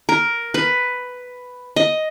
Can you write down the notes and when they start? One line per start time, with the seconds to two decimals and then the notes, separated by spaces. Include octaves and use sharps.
0.09 A#4
0.54 B4
1.76 D#5